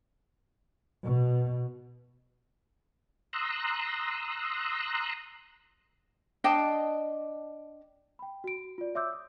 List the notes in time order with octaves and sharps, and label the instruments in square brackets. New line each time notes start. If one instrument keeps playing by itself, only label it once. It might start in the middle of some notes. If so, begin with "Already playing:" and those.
[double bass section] B2
[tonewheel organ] A#5 C6 D#6 E6 F#6
[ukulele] D4 D#5 G5 A5
[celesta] G5 B5
F#4 D7
F4 D5
C#5 E5 C6 D6 E6 G6
D#6